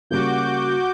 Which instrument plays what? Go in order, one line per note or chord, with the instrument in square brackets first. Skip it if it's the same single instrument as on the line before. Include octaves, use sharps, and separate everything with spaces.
[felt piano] C#3 G3 A#3 [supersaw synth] F#4 D6 G6